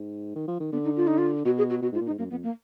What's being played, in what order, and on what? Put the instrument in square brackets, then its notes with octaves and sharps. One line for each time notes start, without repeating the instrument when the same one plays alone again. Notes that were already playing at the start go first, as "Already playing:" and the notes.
Already playing: [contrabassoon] G#2
D#3
F3
D#3
[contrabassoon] D3 [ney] B3
[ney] D#4
F4
D#4
F4
[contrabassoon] B2 [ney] F#4
[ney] G#4
F#4
[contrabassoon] B2 [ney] F#4
[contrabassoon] G#2 [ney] F4
[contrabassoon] A#2
[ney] D#4
[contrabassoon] G#2
[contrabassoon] F#2 [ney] A#3
[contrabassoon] F2 [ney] B3
[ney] A#3